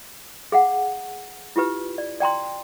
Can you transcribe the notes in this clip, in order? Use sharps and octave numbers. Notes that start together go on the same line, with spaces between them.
G#4 F5 F#5
E4 F4 G4 B4
D5
D5 G5 A#5 C6